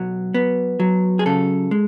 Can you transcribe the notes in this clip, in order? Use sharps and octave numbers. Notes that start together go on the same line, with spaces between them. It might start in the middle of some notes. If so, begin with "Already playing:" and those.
Already playing: B1 F#3
B3
F#3
G#4
C#3 A4
G#3